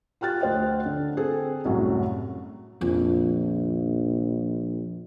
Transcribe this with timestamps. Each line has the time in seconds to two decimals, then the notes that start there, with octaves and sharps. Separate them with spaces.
0.21 F4 G4 G5 F6 F#6 A6
0.41 D2 C5 D#5 G5
0.86 D3
1.17 C4 G#4 A4
1.65 C2 F#2 A2 F#3
2.81 A#1 F2 D#3